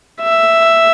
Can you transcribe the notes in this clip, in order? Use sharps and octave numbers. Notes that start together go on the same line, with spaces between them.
E5